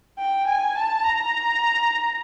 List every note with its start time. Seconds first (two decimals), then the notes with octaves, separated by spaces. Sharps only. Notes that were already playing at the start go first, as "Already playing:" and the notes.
0.19 G5
0.47 G#5
0.75 A5
1.03 A#5